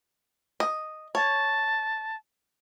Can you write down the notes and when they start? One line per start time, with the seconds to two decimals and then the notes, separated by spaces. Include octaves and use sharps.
0.60 D#5
1.15 C#5 A5